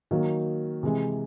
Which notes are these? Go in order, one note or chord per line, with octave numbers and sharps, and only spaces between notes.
D#3 F#3 A#3
C3 E3 G#3